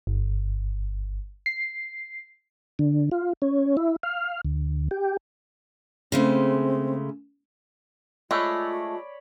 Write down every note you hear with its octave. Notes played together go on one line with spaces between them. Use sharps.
G1
C7
D3
F4
C#4
E4
F5
D2
G4
C#3 G#3 A3 C4
G#3 A3 F4 C#5 D5 B5